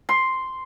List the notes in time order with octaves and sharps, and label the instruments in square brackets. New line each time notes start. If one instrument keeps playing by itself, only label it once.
[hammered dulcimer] C6